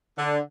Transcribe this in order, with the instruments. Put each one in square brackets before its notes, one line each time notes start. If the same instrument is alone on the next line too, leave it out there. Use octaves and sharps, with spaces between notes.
[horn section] D3